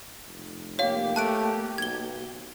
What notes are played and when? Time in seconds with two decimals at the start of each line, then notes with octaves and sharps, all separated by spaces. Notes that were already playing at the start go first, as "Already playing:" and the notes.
0.25 F1
0.79 A#3 G4 C#5 F5
1.16 A3 A5 F#6 D7
1.78 B1 G#6 G7